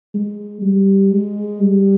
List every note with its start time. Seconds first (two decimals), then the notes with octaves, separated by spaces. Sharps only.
0.14 G#3
0.62 G3
1.12 G#3
1.60 G3